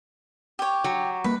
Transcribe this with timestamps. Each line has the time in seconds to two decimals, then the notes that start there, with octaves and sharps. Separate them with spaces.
0.59 G4 C#5
0.84 F#3
1.24 G3 A#3 B4